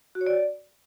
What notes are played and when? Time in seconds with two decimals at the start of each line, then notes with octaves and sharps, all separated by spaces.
0.15 F#4
0.21 C#5
0.27 D5